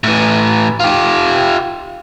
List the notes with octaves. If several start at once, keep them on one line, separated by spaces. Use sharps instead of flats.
A2 E3
F4 G4